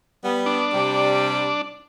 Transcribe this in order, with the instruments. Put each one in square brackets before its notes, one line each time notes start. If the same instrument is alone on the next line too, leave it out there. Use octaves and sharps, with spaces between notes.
[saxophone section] G3 B3
[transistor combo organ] D4
[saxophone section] C3 G3